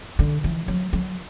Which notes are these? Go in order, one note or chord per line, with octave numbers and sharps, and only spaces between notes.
D3
E3
F#3
F#3